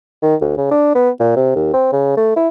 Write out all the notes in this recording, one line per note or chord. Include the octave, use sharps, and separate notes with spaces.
D#3
D2
C#3
D4
B3
A#2
C3
D#2
C4
C#3
A3
E4